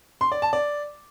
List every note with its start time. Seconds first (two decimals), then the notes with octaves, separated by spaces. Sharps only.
0.21 C6
0.32 D5
0.42 A5
0.53 D5